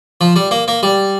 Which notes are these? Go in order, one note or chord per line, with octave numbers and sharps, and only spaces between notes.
F3
G3
A#3
A#3
G3